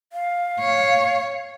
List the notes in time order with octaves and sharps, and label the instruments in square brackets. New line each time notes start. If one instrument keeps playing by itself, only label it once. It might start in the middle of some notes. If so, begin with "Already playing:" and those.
[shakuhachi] F5
[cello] C#5